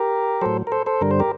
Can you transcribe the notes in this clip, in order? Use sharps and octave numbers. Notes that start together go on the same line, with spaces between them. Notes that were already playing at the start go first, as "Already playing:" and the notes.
Already playing: G4 A#4
A2 F#3 A4 C5
A#4
A4 C5
A4 C5
G2 D3 G3 A#4
C5
G4 A#4